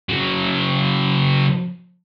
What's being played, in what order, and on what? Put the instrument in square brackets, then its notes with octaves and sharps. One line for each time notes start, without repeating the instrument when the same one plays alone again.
[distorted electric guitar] C#3 F#3